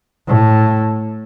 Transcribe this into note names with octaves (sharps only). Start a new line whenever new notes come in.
A2